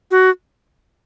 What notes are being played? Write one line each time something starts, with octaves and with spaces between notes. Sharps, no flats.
F#4